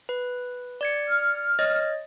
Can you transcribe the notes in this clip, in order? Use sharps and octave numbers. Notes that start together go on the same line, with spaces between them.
B4
D5 G#6 C#7
F6
C#5 D#5 A6